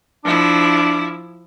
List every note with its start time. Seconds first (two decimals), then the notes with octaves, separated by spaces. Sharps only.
0.25 F3 D4 E4